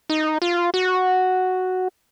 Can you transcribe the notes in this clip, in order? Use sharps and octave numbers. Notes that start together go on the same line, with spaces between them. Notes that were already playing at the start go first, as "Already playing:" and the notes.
D#4
F4
F#4